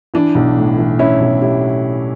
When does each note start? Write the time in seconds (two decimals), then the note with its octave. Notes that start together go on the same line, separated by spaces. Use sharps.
0.14 E3 D4
0.35 B1
0.57 A2
0.78 E3
0.99 E3 C#4 E4
1.21 B1
1.41 A2 E4 G4